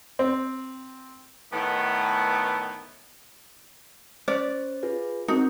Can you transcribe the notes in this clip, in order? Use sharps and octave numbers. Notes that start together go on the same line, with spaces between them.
C4
A2 D#3 A3 B3
C#4 C5 D5
F4 G#4 B4
C4 D#4 F#4 A#4